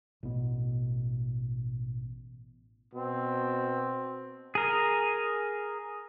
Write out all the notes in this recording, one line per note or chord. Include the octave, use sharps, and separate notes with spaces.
A1 B2
B2 C4
G#4 A#4